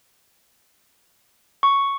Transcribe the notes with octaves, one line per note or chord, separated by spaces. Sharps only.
C#6